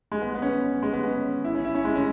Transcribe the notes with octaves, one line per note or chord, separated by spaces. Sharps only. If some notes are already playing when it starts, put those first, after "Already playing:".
G#3
B3
B3
C#4
G#3
B3
C#4
E4
C#4
E4
C#4
G#3
C#4